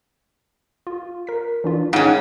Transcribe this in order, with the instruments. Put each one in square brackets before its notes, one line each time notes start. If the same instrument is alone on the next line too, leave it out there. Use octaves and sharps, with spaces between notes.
[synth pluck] F4
A#4 B6
E3 D4 F4
[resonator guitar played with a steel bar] G#2 C#4 [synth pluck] F5 G5